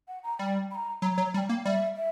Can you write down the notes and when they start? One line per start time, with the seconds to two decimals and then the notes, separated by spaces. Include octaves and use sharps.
0.08 F#5
0.23 A#5
0.39 G3 G5
0.71 B5
0.75 A#5
1.02 F#3 B5
1.06 A#5
1.18 F#3
1.34 G3 A#5
1.38 G5
1.49 A#3
1.65 G3 E5
1.96 E5